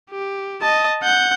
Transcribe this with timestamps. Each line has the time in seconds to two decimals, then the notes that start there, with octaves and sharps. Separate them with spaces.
0.10 G4
0.62 D#5 A5
1.03 F#5 G6